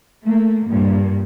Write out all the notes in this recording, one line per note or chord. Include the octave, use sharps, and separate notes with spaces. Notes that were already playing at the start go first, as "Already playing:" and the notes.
A3 A#3
G2 A#2